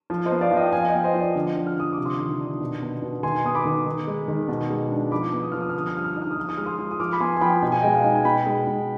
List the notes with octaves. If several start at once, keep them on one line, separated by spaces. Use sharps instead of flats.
F3
C5 D#5
B3
D5 F5
F3
D#5 G5
F3 F5 G#5
D#5 G5
B3
C5 D#5
F3
D5
D3
F3
F6
D3 D#6
C3 D6
C6 D#6
D#3
D4
B2
B3
B2
D#3 G#5 C6
B3 D#6
B5 D6
D#3
D#3
G#3
D#3
B2
G#3
D4
F3 B5 D6
B3
D#6
F3 F6
D#6
F6
D3 D#6
F6
G3 D#6
F6
D#4 D#6
F6
D#6
F3 F6
D#6
G#3 F6
C6 D#6
F3
D#6
F3 D6 F6
B5
B3 G#5 C6
G#5
F3 G5 B5
B2 G5
G#5
G#3 D#5 G5
F5 G#5
D#4
G#5
B2 G5 B5
G#3
B2